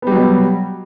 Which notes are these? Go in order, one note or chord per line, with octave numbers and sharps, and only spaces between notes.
B2 F#3 G3 B3